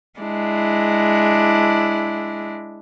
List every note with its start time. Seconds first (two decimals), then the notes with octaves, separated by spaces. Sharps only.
0.20 G#3 D4 E4